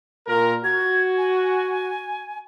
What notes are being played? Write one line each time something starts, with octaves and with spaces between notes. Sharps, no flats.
A#2 A#4
F#4 G#6
G#5